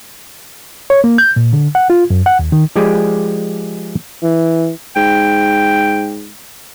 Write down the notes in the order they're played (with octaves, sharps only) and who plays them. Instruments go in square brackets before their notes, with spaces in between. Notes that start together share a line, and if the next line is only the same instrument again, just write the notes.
[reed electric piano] C#5
A#3
G6
A#2
D3
F#5
F4
F#2
F#5
D#2
D#3
[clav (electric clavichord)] F3 G#3 G4 G#4 D5
[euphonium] E3
[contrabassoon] G#2 [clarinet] G5